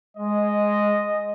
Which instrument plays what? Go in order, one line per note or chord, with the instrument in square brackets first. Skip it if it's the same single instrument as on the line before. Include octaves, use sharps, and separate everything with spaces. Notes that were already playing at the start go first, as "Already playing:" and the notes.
[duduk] G#3 [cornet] D#5